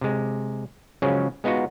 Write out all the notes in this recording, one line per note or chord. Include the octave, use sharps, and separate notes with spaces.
C3 G#3
C#3 F3 F#3 G#3 C#4
G#3 B3 D#4 F4 F#4